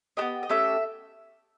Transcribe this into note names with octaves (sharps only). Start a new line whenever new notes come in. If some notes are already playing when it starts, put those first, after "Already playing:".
B3 D4 G4 D#5
D#5
A3 C#4 G4 E5